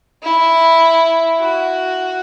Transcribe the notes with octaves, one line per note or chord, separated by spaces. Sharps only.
E4
F#4